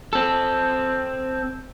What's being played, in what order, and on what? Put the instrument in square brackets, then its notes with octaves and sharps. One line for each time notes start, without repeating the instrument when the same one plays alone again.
[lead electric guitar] C4 A4